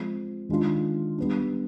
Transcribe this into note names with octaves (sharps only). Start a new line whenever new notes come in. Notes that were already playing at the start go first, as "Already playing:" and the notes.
Already playing: F3 G#3 C4
D#3 G#3 D4 F4
G3 B3 D4